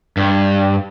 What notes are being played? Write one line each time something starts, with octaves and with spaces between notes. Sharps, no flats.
G2